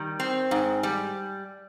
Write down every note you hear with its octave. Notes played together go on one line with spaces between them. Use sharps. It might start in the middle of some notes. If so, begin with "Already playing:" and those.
Already playing: D#3 G3
C4
G#2
G3